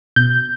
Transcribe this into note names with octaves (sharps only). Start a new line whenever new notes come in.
B2 G6